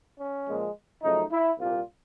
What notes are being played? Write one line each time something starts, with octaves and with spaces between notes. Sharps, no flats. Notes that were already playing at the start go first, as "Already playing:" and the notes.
C#4
A#2 F3 G#3
F#2 C#3 F3 A3 D#4
E4
C2 A#2 G3 A#3 F4